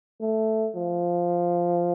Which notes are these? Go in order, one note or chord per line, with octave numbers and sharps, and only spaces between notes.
A3
F3